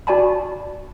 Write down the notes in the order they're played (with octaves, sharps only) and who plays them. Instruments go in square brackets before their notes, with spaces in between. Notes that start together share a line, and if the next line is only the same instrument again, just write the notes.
[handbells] F#4 D5 G#5 A5 B5